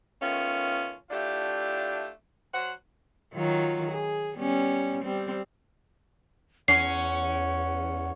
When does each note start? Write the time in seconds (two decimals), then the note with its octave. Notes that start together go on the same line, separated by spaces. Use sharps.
0.21 D#3 A3 B3 C#4 F4
1.10 A3 D4 E4 F4 G4
2.53 F#3 C5 F#5
3.33 D#3 F#3 F4
3.91 G#4
4.36 G3 B3 C#4
5.03 G3 C4
6.68 E2 C#4 F#5 C7